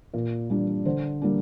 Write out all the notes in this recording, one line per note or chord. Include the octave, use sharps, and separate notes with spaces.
A#2
G3 D4
D3 C5
G3 A#3 D4